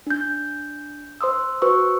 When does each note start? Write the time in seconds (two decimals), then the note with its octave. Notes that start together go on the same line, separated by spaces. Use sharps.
0.07 D4 G6
1.21 C5 C6 D#6 E6
1.62 F#4 B4 C5 C#6 E6